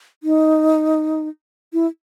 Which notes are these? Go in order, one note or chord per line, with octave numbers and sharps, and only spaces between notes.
D#4
E4